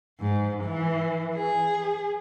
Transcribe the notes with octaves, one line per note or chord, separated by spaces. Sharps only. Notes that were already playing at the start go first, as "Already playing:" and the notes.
G#2
E3
G#4